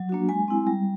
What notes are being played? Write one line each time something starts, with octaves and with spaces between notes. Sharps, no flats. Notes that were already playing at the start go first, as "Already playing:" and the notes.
Already playing: F#3
A#3 D4 F#4
G#3 G#5
C4 E4
G3